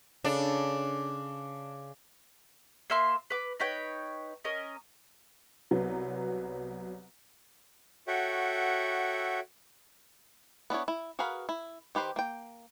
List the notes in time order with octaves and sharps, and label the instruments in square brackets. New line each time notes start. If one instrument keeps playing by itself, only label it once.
[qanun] C#3 A4 B5 [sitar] D4
[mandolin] A#3 E5 C6
B4 D6
D#4 B4 C#5 G5
C#4 A#4 D#5
[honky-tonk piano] C2 F#3 B3
[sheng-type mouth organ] F#4 A4 C#5 E5 F#5 G5
[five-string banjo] B3 D4 E4 C#5
E4
F#4 G#4 A#4 B4 F5
E4
D#3 G4 B4 C5
A#3 G5